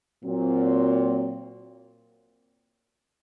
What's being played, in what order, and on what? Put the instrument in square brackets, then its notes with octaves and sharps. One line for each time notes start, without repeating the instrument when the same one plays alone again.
[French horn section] A#2 F#3 C4